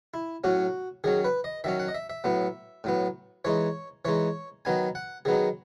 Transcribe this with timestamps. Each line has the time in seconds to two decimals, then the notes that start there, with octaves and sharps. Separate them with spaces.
0.14 E4
0.44 A2 F#3 C#4 F#4
1.04 D#3 F#3 C#4 G#4
1.24 B4
1.44 D#5
1.64 D#3 F#3 C#4 E5
1.79 F#5
1.88 D#5
1.94 E5
2.10 E5
2.24 A2 F#3 B3
2.84 A2 F#3 B3
3.45 E3 G#3 D#4 C#5
4.05 E3 G#3 D#4 C#5
4.65 D#3 F#3 B3 D#4 G#5
4.95 F#5
5.25 D#3 F#3 B3 D#4 G#4